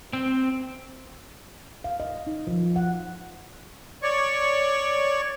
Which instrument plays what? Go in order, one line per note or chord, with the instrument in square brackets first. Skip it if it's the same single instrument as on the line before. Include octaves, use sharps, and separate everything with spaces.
[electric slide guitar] C4
[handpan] F5
D#5
D#4
F3
F#5
[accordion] C#5 D5 C#6